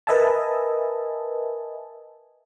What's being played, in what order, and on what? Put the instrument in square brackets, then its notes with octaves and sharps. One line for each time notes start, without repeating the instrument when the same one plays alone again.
[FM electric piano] A#4 B4 D#5 E5 G#5 A5